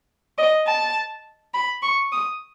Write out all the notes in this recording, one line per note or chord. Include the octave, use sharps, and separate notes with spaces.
D#5
A5
B5
C#6
D#6